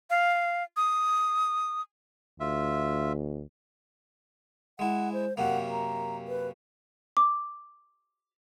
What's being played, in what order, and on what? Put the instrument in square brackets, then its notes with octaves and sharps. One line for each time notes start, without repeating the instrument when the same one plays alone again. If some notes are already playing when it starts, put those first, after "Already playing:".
[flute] F5
D#6
[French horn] D2 [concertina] F4 E5
[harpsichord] G#3 E4 [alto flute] F#5
[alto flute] C5
[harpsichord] F#2 C3 A#3 [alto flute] F#5
[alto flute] A#5
B4
[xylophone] D6